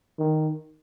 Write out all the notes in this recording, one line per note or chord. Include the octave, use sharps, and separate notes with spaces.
D#3